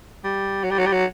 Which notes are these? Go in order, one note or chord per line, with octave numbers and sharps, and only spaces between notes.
G3
F#3
G3
F#3
G3
F#3